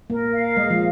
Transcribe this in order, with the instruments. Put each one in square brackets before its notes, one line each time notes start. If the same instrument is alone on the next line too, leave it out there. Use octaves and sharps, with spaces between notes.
[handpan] A#3 [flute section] A#4
[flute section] F5
[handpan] G#3 [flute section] D#5
[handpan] F3